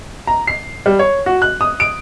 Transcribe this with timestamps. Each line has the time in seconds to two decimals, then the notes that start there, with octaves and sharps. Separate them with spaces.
0.27 A#5
0.47 C7
0.86 G3
0.99 C#5
1.26 F#4
1.42 F#6
1.61 D#6
1.80 D7